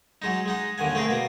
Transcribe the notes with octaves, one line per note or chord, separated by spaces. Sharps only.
F#3 G#3 D#4
G#3 D#4 F#5
D#2 D3 D#3 F#5 G#5
A3 C4 G#4 A#4
B2 A#3 D5